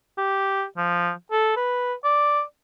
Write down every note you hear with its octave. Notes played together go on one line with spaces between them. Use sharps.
G4
F3
A4
B4
D5